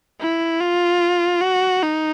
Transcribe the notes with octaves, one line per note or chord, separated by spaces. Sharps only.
E4
F4
F#4
D#4